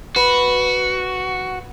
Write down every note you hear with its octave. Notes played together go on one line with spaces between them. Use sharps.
F#4 B4 B5 C#7